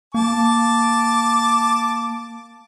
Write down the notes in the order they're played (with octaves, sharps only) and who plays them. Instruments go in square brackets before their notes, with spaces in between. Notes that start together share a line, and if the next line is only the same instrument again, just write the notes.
[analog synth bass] A#3 [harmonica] A5 D6